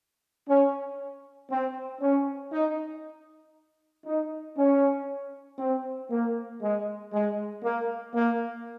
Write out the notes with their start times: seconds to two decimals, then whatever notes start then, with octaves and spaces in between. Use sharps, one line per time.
0.48 C#4
1.50 C4
2.01 C#4
2.52 D#4
4.06 D#4
4.57 C#4
5.59 C4
6.10 A#3
6.61 G#3
7.12 G#3
7.63 A#3
8.14 A#3